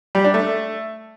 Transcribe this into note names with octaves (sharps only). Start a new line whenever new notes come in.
G3
D4
A3